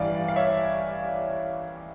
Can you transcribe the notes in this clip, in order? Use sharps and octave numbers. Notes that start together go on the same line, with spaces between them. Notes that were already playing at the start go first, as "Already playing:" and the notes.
Already playing: A1 G2 E3 D5 F5
F5
C#5 E5